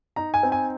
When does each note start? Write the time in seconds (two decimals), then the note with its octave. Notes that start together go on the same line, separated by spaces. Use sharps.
0.16 D#4 A#5
0.34 G#5
0.43 C4
0.52 G#5